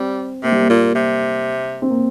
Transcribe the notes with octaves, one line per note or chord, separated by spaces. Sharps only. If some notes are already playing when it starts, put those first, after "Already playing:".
Already playing: G3 C4
C3 A#3
G3
A#3
A#2
C3
C4
A#3